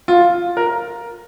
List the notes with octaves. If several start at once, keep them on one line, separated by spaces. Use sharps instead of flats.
F4
A#4